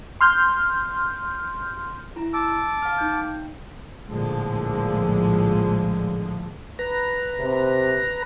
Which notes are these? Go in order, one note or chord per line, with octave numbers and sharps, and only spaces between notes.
C6 F6 G6
E4 A#5
A5 D6 E6
F5 F6
D#4 G6
G5
A#1 A2 D3 F3 G#3
B4 A#5
C3